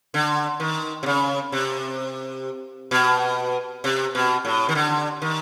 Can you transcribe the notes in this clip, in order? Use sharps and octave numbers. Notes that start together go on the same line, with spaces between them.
D3
D#3
C3
C#3
C3
B2
C3
B2
A2
D#3
D3
D#3